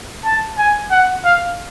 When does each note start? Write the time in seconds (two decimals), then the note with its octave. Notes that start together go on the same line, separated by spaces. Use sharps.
0.25 A5
0.58 G#5
0.91 F#5
1.25 F5